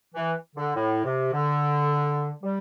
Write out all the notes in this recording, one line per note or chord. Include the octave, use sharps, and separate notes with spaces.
E3
D3
A2
C3
D3
G3